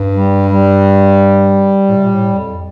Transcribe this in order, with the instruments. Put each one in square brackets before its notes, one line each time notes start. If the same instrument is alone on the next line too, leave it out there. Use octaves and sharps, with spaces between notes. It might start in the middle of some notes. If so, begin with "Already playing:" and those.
Already playing: [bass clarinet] G2
[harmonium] G3
G3
[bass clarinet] A2
C3
A#2
A2
F2